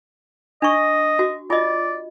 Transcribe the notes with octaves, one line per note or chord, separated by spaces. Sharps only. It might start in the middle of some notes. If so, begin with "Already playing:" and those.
D4 D#5 C#6
F#4
F4 D5 D#5